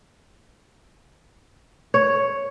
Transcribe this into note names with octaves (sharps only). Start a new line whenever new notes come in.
C#5